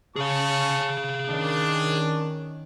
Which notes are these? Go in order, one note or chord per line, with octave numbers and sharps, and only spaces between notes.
C#3 C#4 G#4 F5 A5 C#6
D#3 C#4 D4